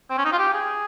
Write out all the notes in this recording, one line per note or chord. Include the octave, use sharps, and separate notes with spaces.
C4
C#4
D#4
F4
G4
G#4